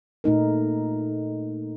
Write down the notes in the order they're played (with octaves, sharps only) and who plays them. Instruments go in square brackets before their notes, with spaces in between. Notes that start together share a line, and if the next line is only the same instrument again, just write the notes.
[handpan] A#2 A3 D#4 A#4